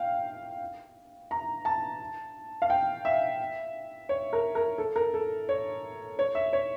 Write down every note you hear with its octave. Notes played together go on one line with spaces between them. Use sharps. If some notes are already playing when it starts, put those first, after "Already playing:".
Already playing: F5 G5
A#5
A5
F5
G5
E5
C#5
A#4
A#4
A4
A#4
A4
C#5
C#5
E5
C#5